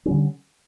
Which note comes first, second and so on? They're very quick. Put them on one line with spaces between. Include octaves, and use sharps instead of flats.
C#4 G3 D3